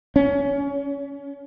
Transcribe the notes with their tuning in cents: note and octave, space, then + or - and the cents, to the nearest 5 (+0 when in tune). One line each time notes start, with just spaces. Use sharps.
C#4 +25